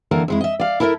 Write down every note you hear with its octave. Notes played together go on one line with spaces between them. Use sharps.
D3 E3 A#3 A4 A#4
F2 G#3 E4
D#5 E5
D5 F5
E4 A4 A#4 D#5 E5